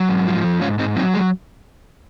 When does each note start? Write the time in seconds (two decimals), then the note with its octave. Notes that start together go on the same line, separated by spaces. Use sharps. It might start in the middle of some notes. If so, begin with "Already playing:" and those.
Already playing: F#3
0.09 G#2
0.27 F3
0.44 F2
0.61 G#2 C#4 F4
0.79 G#2 C4 D#4
0.96 F#3 C4 D#4
1.14 G#3